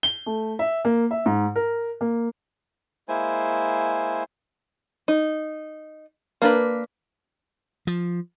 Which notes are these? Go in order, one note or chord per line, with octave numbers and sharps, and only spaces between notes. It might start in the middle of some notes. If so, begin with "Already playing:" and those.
G7
A3
E5
A#3
E5
G#2
A#4
A#3
G#3 A#3 E4 C5 G#5
D#4
A#3 D4 B4
F3